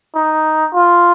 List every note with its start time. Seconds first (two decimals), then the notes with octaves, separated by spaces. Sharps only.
0.15 D#4
0.74 F4